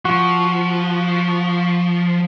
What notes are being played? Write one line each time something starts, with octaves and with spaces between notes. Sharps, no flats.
F3 F#4